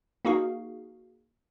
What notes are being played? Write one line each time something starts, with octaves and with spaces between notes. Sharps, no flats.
A#3 D#4 F#4 G#4 F5